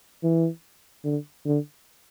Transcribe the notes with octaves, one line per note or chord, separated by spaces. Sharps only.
E3
D3
D3